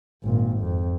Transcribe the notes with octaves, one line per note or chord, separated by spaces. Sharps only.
G#1 A#2
F2